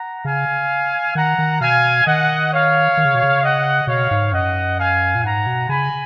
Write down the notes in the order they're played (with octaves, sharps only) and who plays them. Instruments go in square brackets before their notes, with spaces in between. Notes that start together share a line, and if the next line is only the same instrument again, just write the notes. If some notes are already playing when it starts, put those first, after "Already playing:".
Already playing: [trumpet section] F#5 A#5
[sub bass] C#3 [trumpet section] F5 G#5
[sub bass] D#3 [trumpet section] F#5 A#5
[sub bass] D#3
[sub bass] B2 [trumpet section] F5 G#5
[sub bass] D#3 [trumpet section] D#5 F#5
[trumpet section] C#5 F5
[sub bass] D#3
C#3
B2
C#3
[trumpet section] D#5 F#5
[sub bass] B2 [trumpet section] C#5 F5
[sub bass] G#2
[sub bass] F#2 [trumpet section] D#5 F#5
[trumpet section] F5 G#5
[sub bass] A#2
[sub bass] G#2 [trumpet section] F#5 A#5
[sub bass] B2
[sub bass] C#3 [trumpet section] G#5 B5